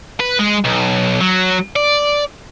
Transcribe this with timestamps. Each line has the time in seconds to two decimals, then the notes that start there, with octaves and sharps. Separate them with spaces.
0.20 B4
0.39 G#3
0.65 B1
1.21 F#3
1.76 D5